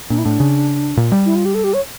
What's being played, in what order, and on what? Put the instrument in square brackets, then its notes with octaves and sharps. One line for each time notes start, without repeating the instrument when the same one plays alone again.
[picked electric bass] A#2 [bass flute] D4
[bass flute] E4
[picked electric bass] A2 [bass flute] D4
[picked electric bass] C#3
A#2
G3
[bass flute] E4
F4
G4
A4
G4
C#5